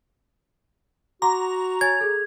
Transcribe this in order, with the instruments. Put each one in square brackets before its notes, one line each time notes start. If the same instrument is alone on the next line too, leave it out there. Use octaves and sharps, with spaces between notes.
[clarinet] F#4 [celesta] F#5 C6 D6 [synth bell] A#5
[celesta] C#5 G#5 A6 [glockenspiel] G#6
[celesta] G#4 A4